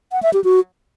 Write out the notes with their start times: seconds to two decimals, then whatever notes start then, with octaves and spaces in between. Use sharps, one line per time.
0.12 F#5
0.23 E5
0.33 G4
0.44 F#4